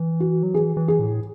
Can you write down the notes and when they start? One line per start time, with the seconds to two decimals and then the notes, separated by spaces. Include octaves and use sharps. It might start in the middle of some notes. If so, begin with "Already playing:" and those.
Already playing: E3
0.20 F#4
0.43 F#3
0.54 E3 G#4
0.77 E3
0.88 G#4
0.99 A2